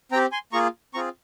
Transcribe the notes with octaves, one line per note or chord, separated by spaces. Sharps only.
C4 G4 G5 A#5
G#5 C6
A#3 F4 G#4 A#5 C#6
C4 F4 G#4 A#5 C#6